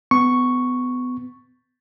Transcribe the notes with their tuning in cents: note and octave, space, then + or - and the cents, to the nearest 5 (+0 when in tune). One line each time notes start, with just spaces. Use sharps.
B3 +25 C#6 +0